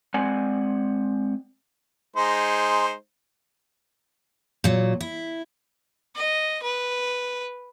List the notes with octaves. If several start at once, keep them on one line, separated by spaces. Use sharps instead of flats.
G#3 C4 D5 F#5 G#5
G#3 D#4 C5
A#2 F#3
E4
D#5
B4